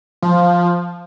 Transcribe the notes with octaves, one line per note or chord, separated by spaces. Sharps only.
F3